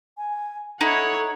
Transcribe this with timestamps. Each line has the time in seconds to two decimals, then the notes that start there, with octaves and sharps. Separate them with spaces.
0.18 G#5
0.81 D#4 E4 A4 C#5 F#5